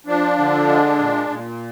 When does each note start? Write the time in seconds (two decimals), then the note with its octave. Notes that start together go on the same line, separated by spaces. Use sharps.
0.07 F3 D4
0.38 D3
0.68 G#3
0.99 A#2
1.29 A#2